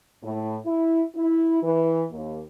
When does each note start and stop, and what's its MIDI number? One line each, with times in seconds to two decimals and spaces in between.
0.23 0.57 45
0.65 1.02 64
1.16 1.60 64
1.63 2.05 52
2.11 2.42 39